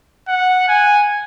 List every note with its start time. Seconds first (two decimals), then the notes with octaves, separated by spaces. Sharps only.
0.28 F#5
0.68 G#5